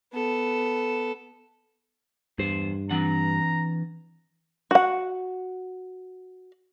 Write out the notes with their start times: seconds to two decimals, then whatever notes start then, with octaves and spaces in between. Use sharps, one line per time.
0.13 B3 A4
2.39 E2 G2 C5
2.91 E3 C4 D4 F#5 A#5
4.71 F#4 F#5